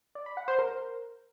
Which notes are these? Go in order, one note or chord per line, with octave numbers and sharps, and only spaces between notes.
D5
B5
F#5
C5
A#4